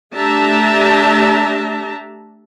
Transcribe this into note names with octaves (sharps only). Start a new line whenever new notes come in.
A3 D4 G4 E5 A5 A#5